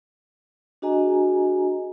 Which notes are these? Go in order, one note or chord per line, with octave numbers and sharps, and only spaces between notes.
D4 F#4 G#4 D#5 G#5 A#5